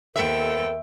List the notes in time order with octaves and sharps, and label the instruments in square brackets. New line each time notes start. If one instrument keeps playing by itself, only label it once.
[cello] D#2 G5 [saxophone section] B3 C4 A4 [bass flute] A#4 [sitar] E5